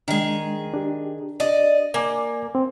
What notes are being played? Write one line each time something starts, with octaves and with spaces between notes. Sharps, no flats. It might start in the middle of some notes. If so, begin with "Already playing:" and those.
D#3 G#3 D4 G#4
D4 G4
D5 D#5
A#3 D5 G#5 D6
C4